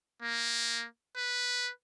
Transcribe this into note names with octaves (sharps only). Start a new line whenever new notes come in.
A#3
B4